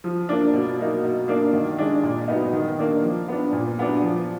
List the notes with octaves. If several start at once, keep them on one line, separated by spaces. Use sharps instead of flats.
F3
A#3 D4
B2
F#3 A#3 D#4
B2
A#3 D4
D#3
G#3 D4
A#2
F#3 B3 D#4
D#3
A#3 D4
F3
B3 D4
A#2
F#3 B3 D4
F3